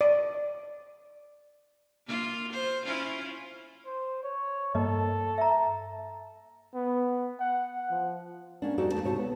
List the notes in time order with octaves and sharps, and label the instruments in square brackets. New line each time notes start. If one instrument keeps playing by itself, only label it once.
[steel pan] D5
[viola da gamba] A#3 F4
C5
C#4 E4 F4
[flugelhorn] C5
C#5
[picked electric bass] G2 A#3 [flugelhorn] A4 [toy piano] D#5
[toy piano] E5 A#5
[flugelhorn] B3
F#5
F3
[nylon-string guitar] A#3 C#4 D4
F2 G3 D#4 F#4 A4 D5
E2 C3 A3 A5
D2 C3 C#5 G#5 A5
B3